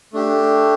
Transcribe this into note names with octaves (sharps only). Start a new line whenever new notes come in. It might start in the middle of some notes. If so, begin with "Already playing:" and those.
A3 D4 G4